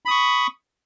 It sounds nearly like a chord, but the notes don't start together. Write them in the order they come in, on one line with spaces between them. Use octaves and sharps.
B5 D#6 C#6